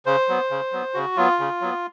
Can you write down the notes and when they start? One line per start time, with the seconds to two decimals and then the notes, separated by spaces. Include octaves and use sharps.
0.06 C#3 C5
0.28 F#3 B3
0.51 C#3
0.72 F#3 B3
0.94 C#3 F#4
1.17 F#3 B3 F4
1.39 C#3
1.61 F#3 B3